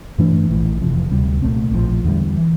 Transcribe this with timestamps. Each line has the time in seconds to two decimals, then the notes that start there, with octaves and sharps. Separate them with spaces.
0.18 G2 E3 A3 D4
0.50 A#1 A2 E3
0.81 F1 E2 C3 F3
1.11 D2 C3 G3
1.42 C2 A#2 A3 C4
1.73 A#1 A2 F3
2.04 E2 D3 G3
2.37 E3